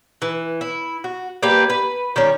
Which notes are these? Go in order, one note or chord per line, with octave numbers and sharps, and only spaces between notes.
E3
E4
F#4
A#3 D4 G4 B4
B4
D#3 G3 C#4